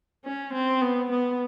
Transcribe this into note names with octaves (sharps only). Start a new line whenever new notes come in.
C#4
C4
B3
B3